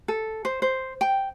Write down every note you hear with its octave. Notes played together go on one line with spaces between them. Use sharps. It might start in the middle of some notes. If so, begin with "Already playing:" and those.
A4
C5
C5
G5